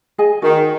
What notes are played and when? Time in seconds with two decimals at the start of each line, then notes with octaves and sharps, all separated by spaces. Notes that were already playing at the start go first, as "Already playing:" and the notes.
0.18 G#4 D#5 G#5
0.42 D#3 F#4